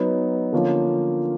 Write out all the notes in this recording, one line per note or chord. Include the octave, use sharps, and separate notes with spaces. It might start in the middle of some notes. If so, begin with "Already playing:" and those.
Already playing: F#3 B3 D#4
D3 F3 A#3 C#4 F4